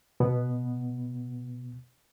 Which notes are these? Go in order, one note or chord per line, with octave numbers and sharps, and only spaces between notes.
B2 B3